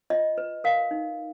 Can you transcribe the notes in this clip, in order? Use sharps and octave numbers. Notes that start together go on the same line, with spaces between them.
F4 D#5
B4
A#4 F5
D#4